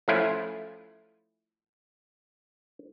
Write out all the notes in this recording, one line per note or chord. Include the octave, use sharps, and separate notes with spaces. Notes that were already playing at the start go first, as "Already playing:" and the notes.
F3 A3 C#4 E4 F4